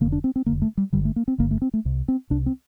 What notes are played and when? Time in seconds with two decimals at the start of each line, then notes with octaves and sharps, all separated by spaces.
0.01 F1 D#2 D3 A#3
0.12 D4
0.24 C4
0.36 C4
0.46 F1 D#2 D3 A#3
0.62 A3
0.77 G3
0.93 G1 G2 D3 G3
1.05 A3
1.16 A#3
1.28 C4
1.38 G1 G2 D3 A#3
1.51 A3
1.62 C4
1.74 A3
1.85 C2 C3
2.08 C4
2.30 C2 C3 D4
2.46 C4